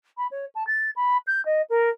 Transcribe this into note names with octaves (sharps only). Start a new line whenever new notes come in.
B5
C#5
A5
A6
B5
G6
D#5
A#4